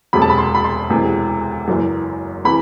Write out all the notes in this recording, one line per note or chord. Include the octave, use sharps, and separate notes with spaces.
E1 D2 C3 F#3 B5
A5
B5
C6
B5
C6
E1 D2 C3 E3
F#1 F#2 E3
C3 E3 B5